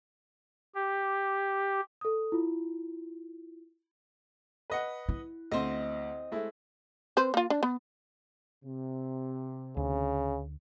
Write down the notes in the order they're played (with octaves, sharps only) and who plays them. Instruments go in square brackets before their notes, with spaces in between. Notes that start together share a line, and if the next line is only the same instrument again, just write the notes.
[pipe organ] G4
[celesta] A4 D#6
E4 F4
[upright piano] B4 D#5 F#5
[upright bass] E4
[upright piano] D2 C6 [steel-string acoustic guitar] C4 D#5
[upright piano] G#3 A3 E4
[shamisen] C4 B4 C5
A#3 F4
D4
B3
[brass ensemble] C3
[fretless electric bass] D2 [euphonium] C#3